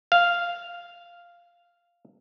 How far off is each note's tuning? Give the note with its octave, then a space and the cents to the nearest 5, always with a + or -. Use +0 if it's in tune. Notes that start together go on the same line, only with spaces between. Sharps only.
F5 -5